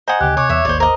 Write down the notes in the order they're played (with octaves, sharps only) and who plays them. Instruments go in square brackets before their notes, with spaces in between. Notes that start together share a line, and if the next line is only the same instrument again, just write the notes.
[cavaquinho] C5 F#5 [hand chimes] D#5 G#5 G#6 [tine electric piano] A#5 D#6
[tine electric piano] D2 C#3 [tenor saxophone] G4 [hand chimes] F#6
[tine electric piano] C3 [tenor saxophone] C#5 [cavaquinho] D6
[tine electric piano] E2 [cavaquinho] E5 [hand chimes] D6
[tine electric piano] G#1 D#2 [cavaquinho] C5 D5
[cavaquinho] A#4 D#5 [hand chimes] C5